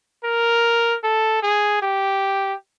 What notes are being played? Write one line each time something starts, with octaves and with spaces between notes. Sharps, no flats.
A#4
A4
G#4
G4